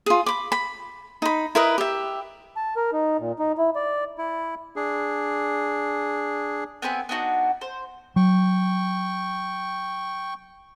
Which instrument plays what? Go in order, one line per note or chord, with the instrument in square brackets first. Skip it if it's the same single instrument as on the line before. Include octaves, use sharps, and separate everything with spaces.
[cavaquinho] F4 G#4
B5 D6
B5
D#4 B5
E4 A#4 B4 D#5
G4 E5
[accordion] A5
A#4
D#4
A#2
D#4
E4
D5
[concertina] E4
D4 G#4
[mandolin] B3 C4 B4 G#5
B3 D4 D#4 F#4
C5
[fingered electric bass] F#3 [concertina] G5 C#6